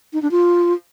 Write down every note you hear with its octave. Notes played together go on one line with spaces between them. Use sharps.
D#4
D4
F4